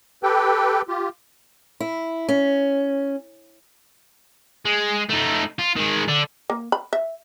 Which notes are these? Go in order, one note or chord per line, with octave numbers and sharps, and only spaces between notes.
G4 A4 B4 G5
F4 G4
E4
C#4
G#3
A3 D#4
F4
D#3 G#3
D3 D4
A#3
B5
E5